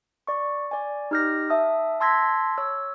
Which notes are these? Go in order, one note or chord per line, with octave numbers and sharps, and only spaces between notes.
D5 C#6
D5 G#5
D#4 G4 F6 G6 A#6
E5 A5 D#6 E6
A5 C6 E6 G#6 A#6 B6
C#5 E6